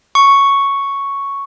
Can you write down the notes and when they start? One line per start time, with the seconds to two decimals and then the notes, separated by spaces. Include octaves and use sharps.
0.15 C#6